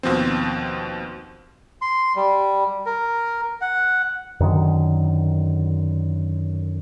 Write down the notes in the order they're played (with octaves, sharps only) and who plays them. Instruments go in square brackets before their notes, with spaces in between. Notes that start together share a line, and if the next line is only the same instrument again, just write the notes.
[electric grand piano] D#2 B2 F3 C4
[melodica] C6
G3
A#4
F#5
[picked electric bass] F#2 D3 D#3